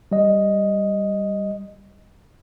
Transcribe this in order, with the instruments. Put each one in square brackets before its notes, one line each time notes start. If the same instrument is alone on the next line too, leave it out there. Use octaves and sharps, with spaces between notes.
[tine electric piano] G3 D#5